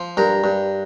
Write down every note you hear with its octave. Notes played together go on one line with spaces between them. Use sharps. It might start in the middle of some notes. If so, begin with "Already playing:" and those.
Already playing: F3
G2 A#4
G2